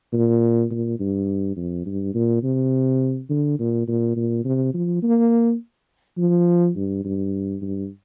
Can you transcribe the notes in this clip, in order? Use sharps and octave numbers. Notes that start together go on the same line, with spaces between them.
A#2
A#2
G2
F2
G2
A#2
C3
D3
A#2
A#2
A#2
C3
F3
A#3
F3
G2
G2
G2